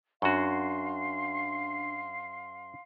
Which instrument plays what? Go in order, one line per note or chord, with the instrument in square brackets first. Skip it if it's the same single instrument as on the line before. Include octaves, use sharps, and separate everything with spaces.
[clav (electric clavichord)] F#2 F#4 [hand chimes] D4 C#6 [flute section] F5 C6